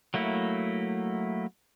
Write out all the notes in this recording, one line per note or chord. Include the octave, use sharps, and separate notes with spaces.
F#3 A3 A#3 E4